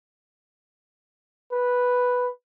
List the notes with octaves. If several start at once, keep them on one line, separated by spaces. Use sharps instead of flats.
B4